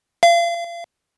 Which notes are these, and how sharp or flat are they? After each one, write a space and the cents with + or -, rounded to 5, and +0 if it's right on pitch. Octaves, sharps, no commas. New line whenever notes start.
F5 -35